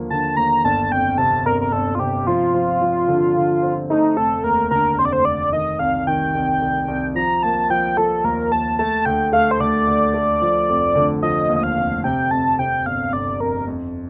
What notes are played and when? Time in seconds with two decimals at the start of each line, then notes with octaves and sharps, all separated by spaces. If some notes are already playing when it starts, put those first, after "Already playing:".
Already playing: D#2 D3 F3 A#3
0.10 D3 A5
0.37 D#2 A#5
0.65 G1 A5
0.91 F2 G5
1.18 C3 A5
1.45 G1 A#4
1.61 A#4
1.72 G1 A4
1.95 F4
1.99 C3 G4
2.27 F3 F4
2.54 F3
2.81 F3
3.08 D3
3.35 D3
3.62 C4
3.90 A3 D#4
4.17 F1 A4
4.44 D#2 A#4
4.71 D3 A#4
4.98 F1 C5
5.05 D5
5.13 C5
5.25 F1 D5
5.52 D#3 D#5
5.79 C2 F5
6.07 D#3 G5
6.34 C2
6.62 C2
6.88 C2
7.15 F3 A#5
7.43 A#3 A5
7.70 F3 G5
7.97 F3 A4
8.24 D#2 A#4
8.51 D#2 A5
8.79 A3 A5
9.05 D2 G5
9.33 A3 F5
9.51 C5
9.60 D2 D5
9.87 D2
10.14 A3
10.42 F3
10.69 F1
10.95 D3
11.22 F3 D#5
11.49 D#2
11.56 D#5
11.63 F5
11.77 F1
12.04 C3 G5
12.31 F2 A5
12.59 C3 G5
12.86 G1 F5
13.13 G1 D5
13.40 F2 A#4
13.68 F2